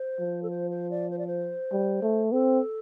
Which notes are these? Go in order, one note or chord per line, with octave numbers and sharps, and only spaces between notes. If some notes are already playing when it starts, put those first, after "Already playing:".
Already playing: C5
F3
A4
C5
C5
D5
C5
D5
C5
G3
A3
C4 A4